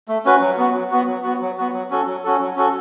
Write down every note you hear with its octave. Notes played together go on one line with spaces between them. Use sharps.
A3
C#4 F#4 B4
F#3
B3 F#4
F#3
B3 F#4
F#3
B3 F#4
F#3
B3 F#4
F#3
C#4 F#4 A4
F#3
C#4 F#4 A4
F#3
C#4 F#4 A4